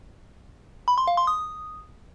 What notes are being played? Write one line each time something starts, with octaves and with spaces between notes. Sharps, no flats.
B5
C6
F5
C6
D#6